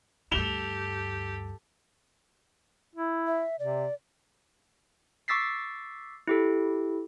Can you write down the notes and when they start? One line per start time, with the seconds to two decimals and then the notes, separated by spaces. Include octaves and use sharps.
0.31 D2 G2 G4 A4 E7 F7 G7
2.95 E4
3.27 E5
3.59 C3 D5
5.28 C#6 D6 E6 A6 B6 C7
6.27 E4 G4 A4